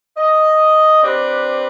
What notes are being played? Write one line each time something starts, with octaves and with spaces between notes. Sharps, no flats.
D#5
C4 D4 G4 B4